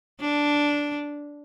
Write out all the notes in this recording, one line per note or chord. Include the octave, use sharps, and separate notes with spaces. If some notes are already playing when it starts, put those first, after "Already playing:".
D4